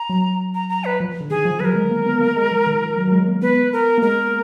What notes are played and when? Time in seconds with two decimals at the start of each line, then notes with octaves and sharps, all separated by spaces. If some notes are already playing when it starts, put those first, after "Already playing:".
Already playing: A#5
0.09 F#3
0.55 A#5
0.69 A#5
0.85 B4
1.00 F3
1.20 D3
1.30 D#3 G#4
1.45 F3
1.60 F#3 B4
1.65 A#4
1.76 G#3
1.91 A#3
2.06 B3
2.21 A#3
2.36 G#3
2.51 F3
2.67 D#3
2.81 F3
2.97 F#3
3.08 F#3
3.12 G#3
3.27 A#3
3.42 B3 B4
3.73 A#4
3.98 A#3
4.02 G#3 A#4